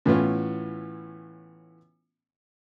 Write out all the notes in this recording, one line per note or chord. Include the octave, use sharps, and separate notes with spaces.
A2 E3 B3 C#4 F4